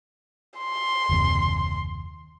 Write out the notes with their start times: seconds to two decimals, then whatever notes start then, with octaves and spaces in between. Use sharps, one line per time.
0.58 C6
1.09 F#1 D#2 C3